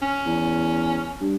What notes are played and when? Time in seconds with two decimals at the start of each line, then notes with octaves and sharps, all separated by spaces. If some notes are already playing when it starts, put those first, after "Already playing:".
0.02 C#4
0.26 E2
1.20 G2